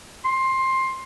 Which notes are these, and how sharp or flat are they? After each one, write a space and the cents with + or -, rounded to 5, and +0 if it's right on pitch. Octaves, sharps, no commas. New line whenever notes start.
C6 +15